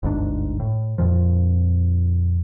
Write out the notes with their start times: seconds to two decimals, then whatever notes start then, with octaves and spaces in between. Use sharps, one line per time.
0.03 G1 D2 G#2 D4
0.60 A2
0.98 F2 A#2 F3